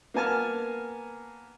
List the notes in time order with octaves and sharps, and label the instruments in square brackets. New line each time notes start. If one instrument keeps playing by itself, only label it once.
[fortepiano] A#3 B3 G#5 A5 F6